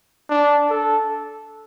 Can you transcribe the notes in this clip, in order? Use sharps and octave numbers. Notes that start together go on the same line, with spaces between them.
D4
A4